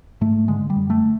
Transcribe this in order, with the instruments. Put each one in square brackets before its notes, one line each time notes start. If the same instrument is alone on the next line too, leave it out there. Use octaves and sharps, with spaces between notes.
[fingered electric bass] G#2 A3
D3 G#3
G3
F#2
A3